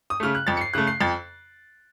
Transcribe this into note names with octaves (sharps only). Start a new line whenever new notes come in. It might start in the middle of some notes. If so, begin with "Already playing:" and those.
D#6
C#3 A3 F6
F#6
F2 A6
C#7
C7
C#3 A3 F#6
C7
F2 A6